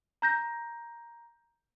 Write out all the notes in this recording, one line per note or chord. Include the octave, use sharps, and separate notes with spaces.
A#5 G6 A#6